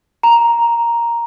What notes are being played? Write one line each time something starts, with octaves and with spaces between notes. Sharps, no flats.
A#5